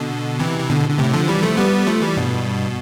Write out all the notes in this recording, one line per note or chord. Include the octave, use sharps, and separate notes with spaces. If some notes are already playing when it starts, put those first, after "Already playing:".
Already playing: B2 D3
C3 E3
C3
B2 D3
D3
A2 C3
D3 F3
E3 G3
F3 A3
G3 B3
F3 A3
E3 G3
G2 B2